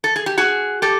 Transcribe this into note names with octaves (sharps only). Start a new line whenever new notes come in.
A4
G#4
G4
F#4 G#4
G4 A4